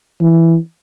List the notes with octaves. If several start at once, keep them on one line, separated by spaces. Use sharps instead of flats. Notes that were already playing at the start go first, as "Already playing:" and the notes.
E3